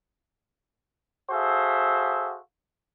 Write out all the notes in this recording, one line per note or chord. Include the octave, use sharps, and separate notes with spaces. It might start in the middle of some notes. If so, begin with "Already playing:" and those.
F#4 G#4 A4 C5 E5 F5